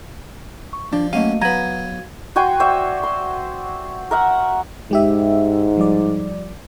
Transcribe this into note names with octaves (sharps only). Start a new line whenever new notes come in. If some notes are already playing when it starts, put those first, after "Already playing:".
C#6
F3 D4 D5
F#3 A3 A#3 C#4 D#5 F5 D#7
F#3 B3 B4 F5 A#5 G#6 D#7
F#4 G5 G#5 C6
F#4 C5 D5 E5
C6
A#4 E5 F#5
G#2 G#3 G4 E5
F3 G3 D5